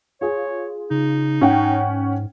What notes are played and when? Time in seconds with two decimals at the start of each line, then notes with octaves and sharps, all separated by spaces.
0.21 F4 G#4 C#5
0.91 C#3 D#4
1.41 G#2 C#4 F#5 G5